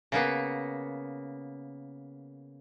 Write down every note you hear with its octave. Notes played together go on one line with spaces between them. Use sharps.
C#3 A#3 B3